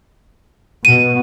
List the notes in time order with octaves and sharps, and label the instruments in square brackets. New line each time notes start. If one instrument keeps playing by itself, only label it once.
[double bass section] B2 [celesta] D#7